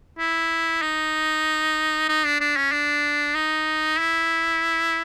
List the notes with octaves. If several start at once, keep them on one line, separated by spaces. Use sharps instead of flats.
E4
D#4
D#4
D4
D4
C#4
D4
D#4
E4